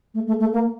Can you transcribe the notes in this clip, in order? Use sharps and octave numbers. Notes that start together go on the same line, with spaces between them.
A3
A3
A3
A#3